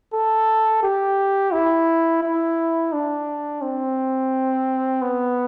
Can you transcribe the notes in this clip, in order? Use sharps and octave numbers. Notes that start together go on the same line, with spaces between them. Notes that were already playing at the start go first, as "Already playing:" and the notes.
A4
G4
E4
E4
D4
C4
B3